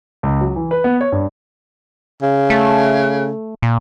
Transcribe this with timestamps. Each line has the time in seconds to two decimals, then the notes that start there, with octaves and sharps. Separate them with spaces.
0.23 C#2
0.41 F#3
0.56 E3
0.71 B4
0.84 B3
1.01 C#5
1.12 G2
2.22 C#3
2.50 A3
3.62 A#2